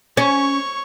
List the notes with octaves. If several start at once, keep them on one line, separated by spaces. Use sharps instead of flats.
C#4 C#5 C#6